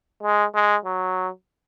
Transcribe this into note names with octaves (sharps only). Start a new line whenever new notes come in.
G#3
G#3
F#3